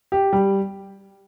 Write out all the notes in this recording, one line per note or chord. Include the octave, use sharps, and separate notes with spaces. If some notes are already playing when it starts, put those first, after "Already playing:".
G4
G3